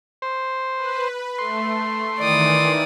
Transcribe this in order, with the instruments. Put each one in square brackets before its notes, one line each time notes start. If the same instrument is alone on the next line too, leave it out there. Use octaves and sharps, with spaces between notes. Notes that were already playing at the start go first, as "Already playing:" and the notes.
[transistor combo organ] C5
[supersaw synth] B4
[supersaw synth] A3 [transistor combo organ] C6
[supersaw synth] D#3 E3 [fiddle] D5 D#6